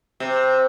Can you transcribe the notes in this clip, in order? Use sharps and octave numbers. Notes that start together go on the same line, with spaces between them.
C3